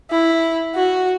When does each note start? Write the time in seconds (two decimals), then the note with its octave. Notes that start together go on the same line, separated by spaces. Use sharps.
0.10 E4
0.75 F#4